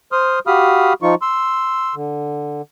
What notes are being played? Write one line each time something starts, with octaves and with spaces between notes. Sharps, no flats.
C5 C6 D#6 F6
F#4 G4 F5 B5 D#6 F6
F3 D#4 F4 C#6
C6 E6
D3